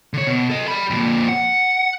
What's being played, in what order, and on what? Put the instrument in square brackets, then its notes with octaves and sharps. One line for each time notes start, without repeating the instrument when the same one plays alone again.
[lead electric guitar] D3 C#5
B2
A4 D#5
D5 B5
F2 A#2
F#5